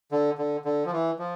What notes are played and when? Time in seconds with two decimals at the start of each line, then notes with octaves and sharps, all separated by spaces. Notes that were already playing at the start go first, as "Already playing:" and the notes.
0.12 D3
0.38 D3
0.65 D3
0.85 F3
0.92 E3
1.19 F3